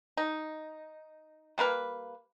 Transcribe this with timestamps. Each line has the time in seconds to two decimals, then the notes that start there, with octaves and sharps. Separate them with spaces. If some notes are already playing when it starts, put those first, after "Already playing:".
0.17 D#4
1.58 G3 A#3 B4 F5